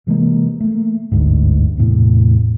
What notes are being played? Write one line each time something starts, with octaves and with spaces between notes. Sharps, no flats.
C3 E3 G#3 A#3
A3 A#3
G1 D2 G#2
E2 A2 C3